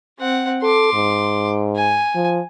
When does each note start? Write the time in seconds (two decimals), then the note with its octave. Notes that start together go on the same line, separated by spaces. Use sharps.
0.19 C4 F#5
0.63 A4 C6 D6
0.94 G#2
1.76 G#5
2.15 F3